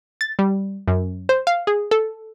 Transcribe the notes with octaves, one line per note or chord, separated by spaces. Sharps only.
A6
G3
F#2
C5
F5
G#4
A4